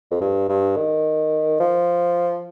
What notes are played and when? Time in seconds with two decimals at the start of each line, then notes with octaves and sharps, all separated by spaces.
0.11 F2
0.21 G2
0.49 G2
0.76 D#3
1.59 F3